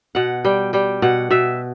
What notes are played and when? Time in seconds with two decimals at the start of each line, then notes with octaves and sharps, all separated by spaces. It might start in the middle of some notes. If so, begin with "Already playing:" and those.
0.15 B2 F#5
0.44 G3 G5
0.73 G3 G5
1.02 B2 F#5
1.31 B2 E5